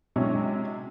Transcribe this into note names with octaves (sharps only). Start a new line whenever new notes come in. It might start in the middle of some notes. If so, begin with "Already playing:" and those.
C3 F#3 G#3 C#4 D4 E4